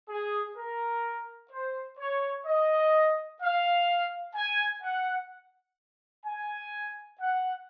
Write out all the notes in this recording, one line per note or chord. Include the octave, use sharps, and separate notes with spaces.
G#4
A#4
C5
C#5
D#5
F5
G#5
F#5
G#5
F#5